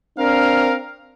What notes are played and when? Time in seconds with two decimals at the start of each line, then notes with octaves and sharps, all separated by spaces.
0.19 C4 D4 A#4 F5